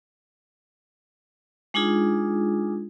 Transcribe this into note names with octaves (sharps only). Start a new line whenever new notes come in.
G#3 D4 D#4 F4 G#4